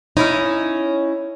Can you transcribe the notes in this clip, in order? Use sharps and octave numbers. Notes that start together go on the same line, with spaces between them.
C#4 D#4 E4 C#5